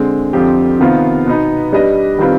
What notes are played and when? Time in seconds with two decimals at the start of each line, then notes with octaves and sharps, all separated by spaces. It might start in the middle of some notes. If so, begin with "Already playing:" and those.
Already playing: D3 G#3 C4
0.33 F2 D3 F3 C4 G4
0.80 C3 D#3 B3 F4 C5
1.26 B2 B3 D#4 B4
1.72 G3 D4 G4 B4 D#5
2.19 D#3 G3 C4 F4 B4